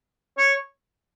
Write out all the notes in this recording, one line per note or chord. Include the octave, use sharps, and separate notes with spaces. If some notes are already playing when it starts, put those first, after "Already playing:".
C#5